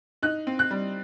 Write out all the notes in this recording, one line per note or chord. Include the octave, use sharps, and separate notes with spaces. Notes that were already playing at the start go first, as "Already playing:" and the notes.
D#4 F#6
C4
F#6
G3